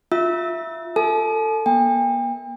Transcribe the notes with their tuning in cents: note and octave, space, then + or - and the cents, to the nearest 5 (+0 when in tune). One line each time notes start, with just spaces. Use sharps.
F4 +10 E5 +0 E6 -20
A4 +20 A5 -45
A#3 +45 G5 +40